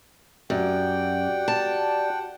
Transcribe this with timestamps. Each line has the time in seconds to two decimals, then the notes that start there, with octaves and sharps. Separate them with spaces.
0.50 F#2 F#4 G4 D5 F#5 G5
1.48 A5